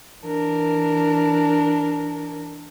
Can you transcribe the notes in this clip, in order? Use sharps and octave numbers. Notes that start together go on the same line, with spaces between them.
E3 D4 A#4